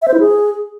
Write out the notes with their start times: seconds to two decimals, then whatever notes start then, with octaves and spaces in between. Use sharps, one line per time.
0.02 E5
0.08 C5
0.14 E4
0.20 G#4